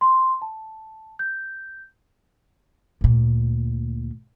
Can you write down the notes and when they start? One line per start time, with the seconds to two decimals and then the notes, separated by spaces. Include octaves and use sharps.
0.01 C6
0.42 A5
1.19 G6
3.01 D2 A#2